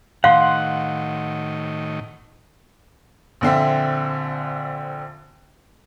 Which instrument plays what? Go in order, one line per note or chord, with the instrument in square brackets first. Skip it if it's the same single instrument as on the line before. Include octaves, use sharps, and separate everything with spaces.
[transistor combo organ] A2 D#3 [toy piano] F5 [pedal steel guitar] F#5 C6
[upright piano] A#1 D3 C4 E5